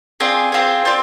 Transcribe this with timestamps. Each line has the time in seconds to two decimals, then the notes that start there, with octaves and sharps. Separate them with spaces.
0.20 C4 F4 G#4 D5
0.52 C4 F4 G#4
0.85 C4 F4 D5